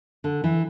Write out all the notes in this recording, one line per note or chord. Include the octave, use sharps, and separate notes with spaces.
D3
E3